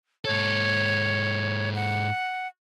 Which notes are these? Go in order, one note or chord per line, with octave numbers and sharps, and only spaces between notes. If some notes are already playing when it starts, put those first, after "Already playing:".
G#2 A4 C#5
F#5